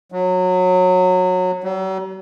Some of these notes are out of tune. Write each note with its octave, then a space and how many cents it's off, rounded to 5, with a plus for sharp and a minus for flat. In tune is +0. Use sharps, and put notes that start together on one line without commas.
F#3 -20
F#3 +45